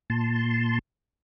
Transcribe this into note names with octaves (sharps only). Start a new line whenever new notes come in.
A#2 A5 C6